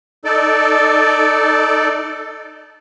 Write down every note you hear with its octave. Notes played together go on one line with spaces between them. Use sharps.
D#4 A4 D5